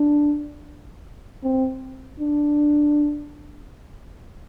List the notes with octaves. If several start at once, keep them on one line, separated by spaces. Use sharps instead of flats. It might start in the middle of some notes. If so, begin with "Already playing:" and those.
Already playing: D4
C4
D4